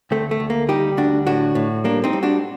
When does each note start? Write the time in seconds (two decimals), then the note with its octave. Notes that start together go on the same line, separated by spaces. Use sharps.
0.11 D2 A3 C4
0.31 A3
0.40 D2
0.50 A#3
0.69 G3 D#4 G4
0.97 D2 D4 F#4
1.26 A2 D4 F#4
1.55 A2
1.84 G3 A#3 D4
2.04 C4 D#4
2.13 G3
2.23 D4 F#4